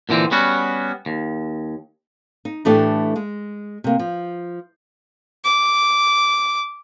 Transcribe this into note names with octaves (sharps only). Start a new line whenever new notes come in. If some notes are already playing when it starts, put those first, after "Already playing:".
A#2 D3 E3 C4
G3 B3 C#4 F#4
D#2
D#4
A2 E3 A3 B3 D4 G4
G#3
C3 A#3
F3
D6